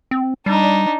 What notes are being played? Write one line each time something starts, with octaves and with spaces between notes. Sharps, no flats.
C4
G3 D4 D#4